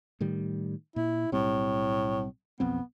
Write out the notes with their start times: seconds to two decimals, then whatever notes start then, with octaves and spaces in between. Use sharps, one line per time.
0.20 A2 D#3 G3
0.96 A#2 E4
1.32 B1 A2 G3 C4
2.60 B1 F2 B3 C4